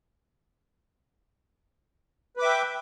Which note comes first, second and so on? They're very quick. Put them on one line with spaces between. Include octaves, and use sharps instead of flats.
B4 D6 E5 G5